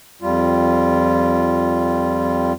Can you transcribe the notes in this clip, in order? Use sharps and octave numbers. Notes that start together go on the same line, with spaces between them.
F2 G3 F4